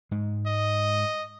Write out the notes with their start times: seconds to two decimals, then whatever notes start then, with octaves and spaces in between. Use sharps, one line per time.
0.11 G#2 G#3
0.47 D#5